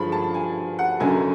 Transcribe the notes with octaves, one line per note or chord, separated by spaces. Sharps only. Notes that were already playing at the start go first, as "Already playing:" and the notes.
Already playing: G2 D3 F3 G#3 B5
A5
G#5
F#5
F#1 F#2 D3 F#3 G#5